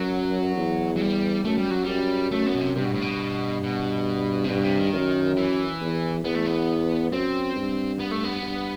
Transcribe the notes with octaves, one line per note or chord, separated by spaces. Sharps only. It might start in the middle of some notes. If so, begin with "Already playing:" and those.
Already playing: F#2 F#3
E2
F#3
G3
F#2 A3
G3
F#3
F#2 G3
F#2 A3
B3
B2
C3
G2 C3
B2
A2
B2
B2
C3
G2 B2
C3
D#3
F#2
E3
E2
E2 B3
A3
B3
F#2 C4
G2
B3
A3
B3
G2